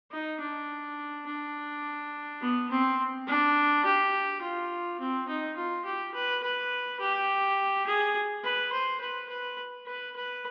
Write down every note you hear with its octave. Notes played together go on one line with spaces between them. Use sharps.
D#4
D4
D4
B3
C4
D4
G4
F4
C4
D#4
F4
G4
B4
B4
G4
G#4
B4
C5
B4
B4
B4
B4